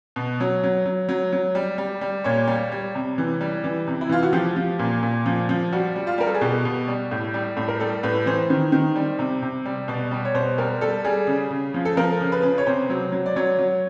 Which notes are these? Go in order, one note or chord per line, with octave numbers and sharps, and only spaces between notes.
B2
F#3
F#3
F#3
F#3
F#3
G3
G3
G3
A#2 C#5
G3
G3
C3
E3
G3
E3
C3
E4
E3 F4
F#4
F3 G4
F3
A#2
A#2
F3
F3
G3 F#4
G3
F4
G3 A#4
A4
G#4
B2 G4
B2
G3
A2
G3
A2
A#4
G3 A4
A2 B4
E3 C5
D#3
D#3
G3
C3
C3
G3
B2 D5
G3
C#5
B2 C5
G3 A#4
G3 A4
G3 G#4
C#3
C#3
F3
A4
F3 A#4
C#3
B4
C#3
C#5
C3 C5
F#3
F#3
D5
F#3 C#5
F#3